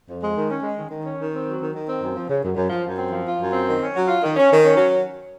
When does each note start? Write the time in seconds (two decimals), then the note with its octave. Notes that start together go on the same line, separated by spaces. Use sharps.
0.08 F2
0.22 G#3
0.35 D#3
0.49 C#4
0.63 G#3
0.77 D#3
0.91 D#3
1.05 C#4
1.18 D#3
1.32 C4
1.46 F#3
1.59 D#3
1.74 D#3
1.87 C4
2.01 F#2
2.15 F3
2.28 C#3
2.43 F#2
2.56 F#2
2.70 F3
2.85 F#2
2.97 C4
3.11 F3
3.25 F4
3.39 F#2
3.53 C4
3.67 D#3
3.81 C#4
3.95 F#3
4.08 F4
4.22 D#3
4.36 C#4
4.50 D#3
4.64 C#4
4.77 F#3